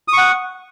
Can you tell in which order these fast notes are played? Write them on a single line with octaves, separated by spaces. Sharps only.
D#6 C#6 F#5